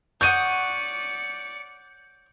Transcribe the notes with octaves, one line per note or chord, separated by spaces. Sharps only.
C#5 D5 F#5 D#6 G6 C#7 D#7